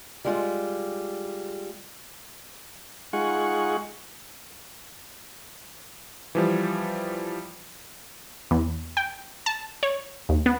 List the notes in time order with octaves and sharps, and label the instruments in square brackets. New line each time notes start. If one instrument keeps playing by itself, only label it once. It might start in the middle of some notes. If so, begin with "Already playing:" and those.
[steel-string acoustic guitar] G3 G#3 F4
[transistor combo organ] G#3 D#4 F4 G#4 F#5 C#6
[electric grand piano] E3 F3 G3
[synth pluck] E2
G5
A5
C#5
D#2
B3